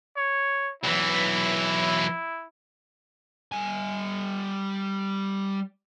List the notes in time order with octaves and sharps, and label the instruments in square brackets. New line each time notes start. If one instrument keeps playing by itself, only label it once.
[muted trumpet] C#5
[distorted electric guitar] B1 E3 [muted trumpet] E4
[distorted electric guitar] G3 G#5